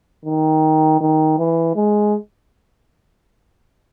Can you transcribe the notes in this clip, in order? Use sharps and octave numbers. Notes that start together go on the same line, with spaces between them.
D#3
D#3
E3
G#3